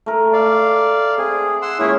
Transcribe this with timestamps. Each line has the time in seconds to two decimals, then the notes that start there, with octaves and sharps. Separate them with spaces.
0.06 A3 A#4
0.33 D5 F5
1.18 C4 G#4
1.62 F#5 C6 E6
1.79 A#2 G#3 C#4 E4 G#4 C#5